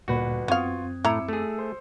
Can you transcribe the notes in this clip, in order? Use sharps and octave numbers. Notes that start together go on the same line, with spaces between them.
G1 D2 A#2 F#4 B4
F#2 B3 C4 F4 F5 C#6 D#6 G#6
A2 E4 A#5 D6 E6 C#7
A3 G#4
C5